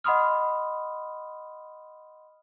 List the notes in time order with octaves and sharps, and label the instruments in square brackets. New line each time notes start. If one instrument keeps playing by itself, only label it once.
[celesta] D#5 F#5 B5 C6 D#6 F6